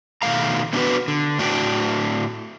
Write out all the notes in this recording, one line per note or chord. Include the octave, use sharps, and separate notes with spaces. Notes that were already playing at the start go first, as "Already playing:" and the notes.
B2 D#3 A3 F5 A#5
B3 D4 F4 F#4 B4
D3
A2 D4 F#4 G5